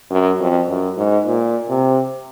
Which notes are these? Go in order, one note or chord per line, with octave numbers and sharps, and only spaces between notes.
F#2
F2
F#2
G#2
A#2
C3